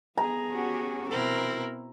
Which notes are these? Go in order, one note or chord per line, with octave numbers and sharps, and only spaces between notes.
B3 G#4 A#5
C#4 F#4 G4
B2 C4 E4 A#4